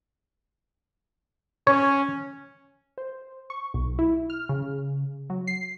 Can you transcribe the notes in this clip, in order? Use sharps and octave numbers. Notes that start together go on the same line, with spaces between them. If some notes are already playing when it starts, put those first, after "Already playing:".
C#4 C#5
C5
C#6
B1
E4
F6
C#3
F#3
C7